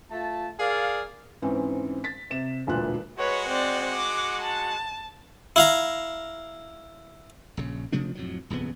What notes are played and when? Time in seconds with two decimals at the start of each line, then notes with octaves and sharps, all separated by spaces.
0.11 A3 F4 A5
0.59 G#4 A#4 D5 F5
1.42 G#2 E3 C4 C#4
2.04 A6 B6
2.31 C3 E7
2.67 E1 D2 A#2 E3 F4 F#6
3.19 G#3 F#4 B4 C#5 F#5
3.48 C4 D5
3.93 D6
4.42 A5
5.56 E4 F5 A#5
7.57 A#1 C#3
7.92 C3 F3 A3 D4
8.15 F2 A2 F#3
8.50 D#1 F2 C#3 B3